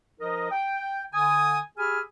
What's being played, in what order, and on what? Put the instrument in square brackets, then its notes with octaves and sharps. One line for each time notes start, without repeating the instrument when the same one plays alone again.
[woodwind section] F3 D#4 A#4 D#5
G5
D3 G#5 D#6
G4 G#4 G#5 B5 E6 F6